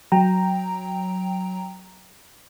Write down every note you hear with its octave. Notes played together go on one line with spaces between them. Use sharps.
F#3 G5 A#5